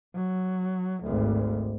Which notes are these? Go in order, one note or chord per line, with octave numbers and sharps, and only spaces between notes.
F#3
G#1 D2